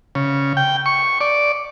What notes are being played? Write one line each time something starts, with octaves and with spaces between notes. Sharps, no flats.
C#3
G5
C#6
D5